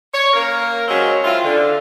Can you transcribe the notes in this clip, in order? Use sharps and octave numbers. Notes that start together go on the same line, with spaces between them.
C#5
A#3 C#4 A#4
F#3 G#3 C4 C#4
C4 E4 F4
D3